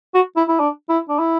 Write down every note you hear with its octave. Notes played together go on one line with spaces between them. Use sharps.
F#4
E4
E4
D4
E4
D4
E4